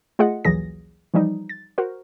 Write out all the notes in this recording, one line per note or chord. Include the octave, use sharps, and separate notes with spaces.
A3 F4 G#4 D#5 F#5
A#1 D#2 E3 F#3 G#4 A#6
E3 F3 G3 D#4
A6
F#4 A#4 C5